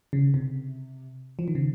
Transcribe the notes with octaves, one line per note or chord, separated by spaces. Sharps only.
C#3
C3
F3
D#3
C#3